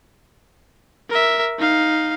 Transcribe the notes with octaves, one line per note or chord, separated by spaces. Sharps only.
A#4 E5
D#4 F5